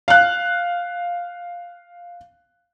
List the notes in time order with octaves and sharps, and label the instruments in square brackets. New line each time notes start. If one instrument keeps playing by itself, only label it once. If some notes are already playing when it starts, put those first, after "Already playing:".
[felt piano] F5 F#6